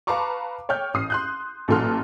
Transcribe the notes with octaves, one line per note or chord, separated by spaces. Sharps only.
B4 F5 A5 A#5 C#6 D6
C#5 G5 F6 G6
A1 D#6 C7
C6 F#6 G6
A1 A#2 F#3 A4 C6 F6